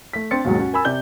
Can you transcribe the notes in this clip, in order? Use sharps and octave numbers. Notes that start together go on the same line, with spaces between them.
A3 B6
C4 D4 C6 A6 C#7
D#2 G#2 B2 F#3 G#3
C#4 F#4
A#4 G#5 B5 E6
C3 D5 G6 G7